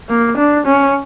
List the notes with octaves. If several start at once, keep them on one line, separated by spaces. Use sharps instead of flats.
A#3
D4
C#4